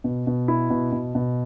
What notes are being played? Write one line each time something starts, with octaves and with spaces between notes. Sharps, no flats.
B2
B2
E4
B2
B2
B2